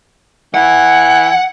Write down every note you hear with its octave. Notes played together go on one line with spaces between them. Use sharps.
E3 F#5